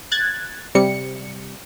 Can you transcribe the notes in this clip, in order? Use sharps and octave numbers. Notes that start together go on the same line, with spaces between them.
F#6 G#6 A6
C3 G3 C#7